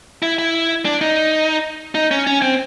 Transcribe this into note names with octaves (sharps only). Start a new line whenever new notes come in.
E4
E4
D4
D#4
D#4
C#4
C#4
C4